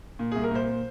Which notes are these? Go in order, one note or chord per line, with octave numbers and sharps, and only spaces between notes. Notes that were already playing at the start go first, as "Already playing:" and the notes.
A#2
C2 G#4
A#4
A#2 C5